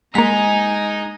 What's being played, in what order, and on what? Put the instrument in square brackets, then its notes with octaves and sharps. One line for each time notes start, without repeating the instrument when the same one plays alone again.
[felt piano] G#3 [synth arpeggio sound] A#3 B6 [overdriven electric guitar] D#4 [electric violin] G#5 A#5